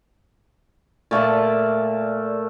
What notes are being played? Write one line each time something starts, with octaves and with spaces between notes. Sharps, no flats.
A#2 A3 D5 A5